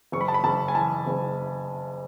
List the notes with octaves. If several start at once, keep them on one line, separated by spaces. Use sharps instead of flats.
F#1 C#6
B5
A5
B5
F#1 A5
G#5
E3 A5
F#1